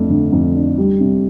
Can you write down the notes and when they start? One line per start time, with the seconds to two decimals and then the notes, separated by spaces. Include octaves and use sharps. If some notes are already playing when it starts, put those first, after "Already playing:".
Already playing: F2 A3 D4
0.10 D3
0.32 F2
0.54 D4
0.78 G3
1.00 C3